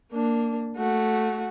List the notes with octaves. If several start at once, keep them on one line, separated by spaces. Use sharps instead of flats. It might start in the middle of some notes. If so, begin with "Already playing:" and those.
A#3 D4
A3 F#4